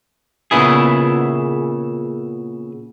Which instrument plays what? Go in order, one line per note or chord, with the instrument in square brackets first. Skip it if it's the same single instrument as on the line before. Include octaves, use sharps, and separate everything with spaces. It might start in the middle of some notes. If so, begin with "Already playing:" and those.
[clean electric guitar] A#2 C#3 B3 E4 G#4